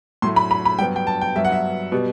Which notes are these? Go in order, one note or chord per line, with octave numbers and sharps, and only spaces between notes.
A2 F#3 A3 C6
B5
B5
B5
G2 F#3 B3 G5
G5
A5
G5
G2 F#3 B3 E5
F#5
E5
B2 G3 B3